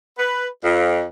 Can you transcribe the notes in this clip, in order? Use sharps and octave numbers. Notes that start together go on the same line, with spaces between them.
B4
F2